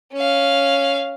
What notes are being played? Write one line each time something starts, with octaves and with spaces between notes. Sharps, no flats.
C#4 F5